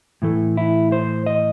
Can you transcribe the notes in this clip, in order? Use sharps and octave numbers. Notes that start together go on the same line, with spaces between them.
A2 E3 A3
E4
C5
D#5